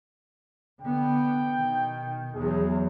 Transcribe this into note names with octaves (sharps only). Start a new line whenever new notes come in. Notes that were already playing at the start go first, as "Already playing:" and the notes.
D3 B3 G5
B2 D#3
E2 F#3 G#4